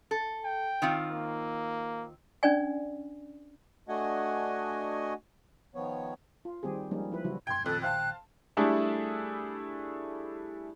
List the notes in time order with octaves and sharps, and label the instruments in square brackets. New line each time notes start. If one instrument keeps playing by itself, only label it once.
[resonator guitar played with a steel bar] A4
[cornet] G5
[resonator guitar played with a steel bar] D#3 C4 F4
[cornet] A#3
[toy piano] C#4 D4 D5 G#5
[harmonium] A3 D4 F#4 D#5 F#5 G#5
D#3 F3 B3 C#5
[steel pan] F4
D#3 G3 C4 G4 G#4
F3 G3 G#3 A#3 C#4 D#4
F3 E4 B4
C#3 E3 F#3 G3 E4 F#4
[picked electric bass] E1 F#2 [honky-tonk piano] G5 C6 [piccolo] G#6
[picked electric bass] B1 A#2 D#3 [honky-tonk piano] F2 [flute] A4 [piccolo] F#6
[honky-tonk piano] C5 F5 A5 [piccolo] G5 [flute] F#6
[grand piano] G3 A3 D4 E4 G#4 A4